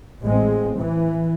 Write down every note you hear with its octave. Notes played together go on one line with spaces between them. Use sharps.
A1 G#3 C4
E3